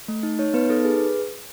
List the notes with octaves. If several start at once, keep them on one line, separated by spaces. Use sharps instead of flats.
A3
D#4
D#4 C#5
B3 B4
D#4 A4
G#4 B4